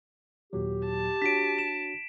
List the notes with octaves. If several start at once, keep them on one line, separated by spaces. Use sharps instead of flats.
D#2 A#2 F#3 G4
A5
D4 F#4 C#5 B6 D7
E7